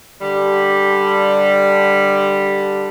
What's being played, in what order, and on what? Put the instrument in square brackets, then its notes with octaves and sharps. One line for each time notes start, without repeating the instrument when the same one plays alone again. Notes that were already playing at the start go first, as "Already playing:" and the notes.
[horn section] D3 G3